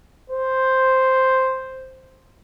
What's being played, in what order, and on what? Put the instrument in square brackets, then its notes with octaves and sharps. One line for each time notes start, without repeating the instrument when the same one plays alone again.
[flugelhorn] C5